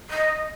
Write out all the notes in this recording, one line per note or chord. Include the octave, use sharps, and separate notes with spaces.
D#5